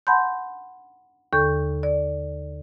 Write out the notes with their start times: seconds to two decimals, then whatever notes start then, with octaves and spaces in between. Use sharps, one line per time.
0.07 F#5 A5 B5 C6 G6
1.33 D#2 D3 A4 C#6 G6
1.83 D5